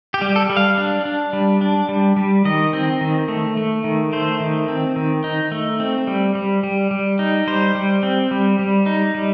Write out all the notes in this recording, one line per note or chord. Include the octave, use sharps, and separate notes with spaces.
G4
G3
A4
G3
F5
D4
D4
G3
D4
G3
G3
D#3 D#5
C4
D#3
A3
A3
D#3
A3 C5
D#3
C4
D#3
D#4
A3
C4
G3
G3
G3
G3
D#4
G3 C5
G3
C4
G3
G3
D#4
G3